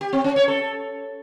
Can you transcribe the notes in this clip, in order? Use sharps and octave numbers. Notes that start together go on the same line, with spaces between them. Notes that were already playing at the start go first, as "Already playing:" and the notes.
G4
C4
C#4
C#5
A4